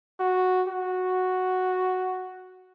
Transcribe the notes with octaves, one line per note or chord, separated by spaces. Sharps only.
F#4
F#4